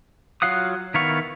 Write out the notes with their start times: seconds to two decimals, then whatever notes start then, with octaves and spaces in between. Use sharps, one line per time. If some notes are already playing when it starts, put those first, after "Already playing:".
0.42 F#3 F4 F5 F#5 D#6
0.94 D#3 B3 E4 F5 C#6